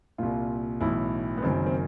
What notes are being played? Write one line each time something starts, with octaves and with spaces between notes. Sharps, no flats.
C2 A#2 F4
B1 A2 E3 E4
B3
F#1 F#2 D#3 C4
C4